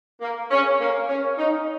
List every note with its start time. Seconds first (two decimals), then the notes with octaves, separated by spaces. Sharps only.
0.21 A#3
0.50 C#4
0.80 A#3
1.07 C#4
1.37 D#4